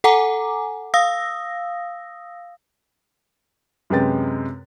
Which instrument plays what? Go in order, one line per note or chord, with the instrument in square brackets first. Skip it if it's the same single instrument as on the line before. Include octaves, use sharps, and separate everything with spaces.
[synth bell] A4 F#5 G#5 A#5 D6
F5 D#6 E6 A#6
[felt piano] F#2 C3 G#3 B4 G5 A6